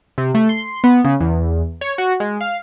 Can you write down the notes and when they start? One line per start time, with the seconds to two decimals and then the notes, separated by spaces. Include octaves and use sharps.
0.18 C3
0.35 A3
0.49 C6
0.84 B3
1.04 C#3
1.20 E2
1.81 C#5
1.98 F#4
2.20 G#3
2.41 F5